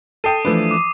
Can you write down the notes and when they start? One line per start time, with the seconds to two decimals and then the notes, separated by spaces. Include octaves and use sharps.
0.24 A4 G5 D#6 C7 D#7
0.45 E3 F3 A3 D4 B4
0.71 D6